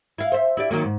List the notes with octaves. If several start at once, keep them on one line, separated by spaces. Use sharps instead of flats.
E4 F5
C5 E5
E4 G4 D5
D#3 F#3 A#3
G#2